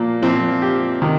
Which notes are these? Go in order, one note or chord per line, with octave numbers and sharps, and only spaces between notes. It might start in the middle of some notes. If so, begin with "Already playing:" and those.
Already playing: A#2 F3 A#3
A#2 F3 C4
G4
C3 D#3